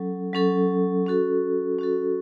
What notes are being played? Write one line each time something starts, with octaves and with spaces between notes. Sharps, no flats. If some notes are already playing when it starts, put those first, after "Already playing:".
Already playing: F#3 C#4 A4
F#3 C#4 A4
C#4 F#4 A4
C#4 F#4 A4